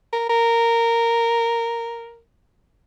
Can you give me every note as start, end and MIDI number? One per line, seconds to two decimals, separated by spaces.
0.13 0.25 70
0.30 2.19 70